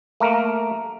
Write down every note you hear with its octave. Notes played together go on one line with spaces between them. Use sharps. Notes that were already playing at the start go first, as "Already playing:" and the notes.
A3 A#3 A#4